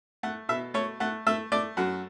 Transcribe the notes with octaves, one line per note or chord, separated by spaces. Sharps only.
A3 F#5
B2 E5
A3 C#5
A3 F#5
A3 E5
A3 D5
F#2 F#4